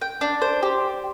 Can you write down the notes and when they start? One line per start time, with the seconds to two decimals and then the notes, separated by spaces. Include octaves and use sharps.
0.01 G5
0.21 D4
0.42 C5
0.63 G4